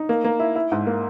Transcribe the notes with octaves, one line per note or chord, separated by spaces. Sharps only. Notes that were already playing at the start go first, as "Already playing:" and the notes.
Already playing: D#4
A#3
A#3
E4
E4
G#2
A#3